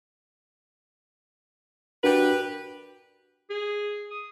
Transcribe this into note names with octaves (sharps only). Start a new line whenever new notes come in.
D4 F#4 G4 A#4 B4
G#4
D#6